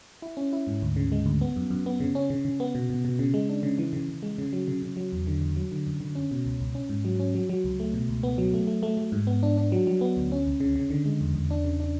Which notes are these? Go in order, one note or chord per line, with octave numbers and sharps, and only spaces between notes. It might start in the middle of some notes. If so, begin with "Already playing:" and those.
E4
C#4
E4
G#2
D2
C#3
G#3
D2
B3
F#2
F#2
B3
C#3
C#4
C#3
C#3
B3
B2
B2
B2
C#3
G#3
D4
C#3
E3
C#3
C#3
G#3
C#3
F#3
C#3
C#3
F#3
E2
D3
E2
F#3
D3
F#2
D3
C#4
B2
C#2
C#2
C#4
G#2
F#3
C#4
F#3
F#3
C#2
A3
B2
C#2
B3
F#3
A3
A3
A3
A3
G#2
B3
D4
D4
F#3
F#3
B3
D2
C#4
C#2
C#3
C#3
D3
G#3
E2
E2
D4
C#3
D4